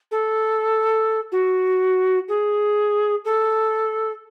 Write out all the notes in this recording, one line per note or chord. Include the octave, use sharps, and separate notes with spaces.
A4
F#4
G#4
A4